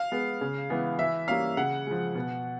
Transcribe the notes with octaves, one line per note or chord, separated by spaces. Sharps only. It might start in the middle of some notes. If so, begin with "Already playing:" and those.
Already playing: F5
G#3 B3
C#3
E3 G#3 B3
E3 E5
G3 A#3 C#4 F5
C#3 F#5
F3 G#3
B2